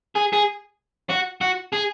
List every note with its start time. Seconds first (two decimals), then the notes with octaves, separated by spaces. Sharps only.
0.15 G#4
0.33 G#4
1.10 F#4
1.41 F#4
1.73 G#4